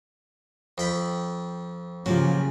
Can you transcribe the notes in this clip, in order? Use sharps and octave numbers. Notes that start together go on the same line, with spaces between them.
F2 G5 B5
A#2 C#3 F3 F#3 G4